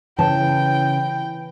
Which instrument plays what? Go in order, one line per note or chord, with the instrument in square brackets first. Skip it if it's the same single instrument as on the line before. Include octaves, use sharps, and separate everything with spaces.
[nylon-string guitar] C#3 A5 [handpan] E3 [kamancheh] G5